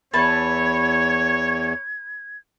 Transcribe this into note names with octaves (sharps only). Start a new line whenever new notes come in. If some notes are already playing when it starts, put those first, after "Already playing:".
E2 B4 C#5 E5 A5 G#6